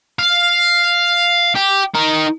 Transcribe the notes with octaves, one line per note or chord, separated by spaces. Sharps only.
F5
G4
D#4 A#4